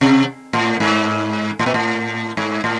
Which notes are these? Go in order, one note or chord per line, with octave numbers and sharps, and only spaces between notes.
C3
A2
G#2
A2
A#2
A2
G#2
A2